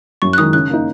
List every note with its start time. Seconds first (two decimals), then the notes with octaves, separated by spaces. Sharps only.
0.22 F#2 C#6
0.33 F#6
0.38 D#3 G#3 D#6
0.53 C#3 F#6
0.70 A#3 D#4